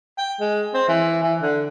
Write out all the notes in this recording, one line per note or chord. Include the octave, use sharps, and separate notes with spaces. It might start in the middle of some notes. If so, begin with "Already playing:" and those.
G5
G#3
C4
E3
E3
D3